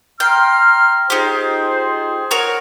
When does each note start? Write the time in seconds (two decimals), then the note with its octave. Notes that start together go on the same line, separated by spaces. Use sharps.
0.20 G5 A#5 C6 F6
1.10 D#4 F4 G4 G#4 C5
2.31 F#4 A#4 C#5